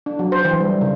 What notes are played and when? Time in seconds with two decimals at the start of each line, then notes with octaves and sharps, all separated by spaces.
0.06 D4
0.19 F#3
0.32 C5
0.45 E3
0.60 G3
0.81 C#3